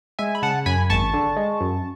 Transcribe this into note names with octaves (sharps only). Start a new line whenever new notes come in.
G#3 E5 G#5
B5
C#3 F#5 A5
F#2 G#5 B5
G#1 A5 C#6
D3
G#3
F#2